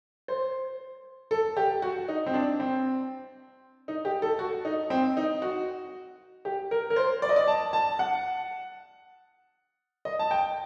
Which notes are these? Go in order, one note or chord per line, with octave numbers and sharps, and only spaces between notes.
C5
A4
G4
F#4
D#4
C4
D4
C4
D#4
G4
A4
F#4
D#4
C4
D#4
F#4
G4
A#4
A#4
C5
D5
D#5
D5
A5
A5
F#5
D#5
A5
G5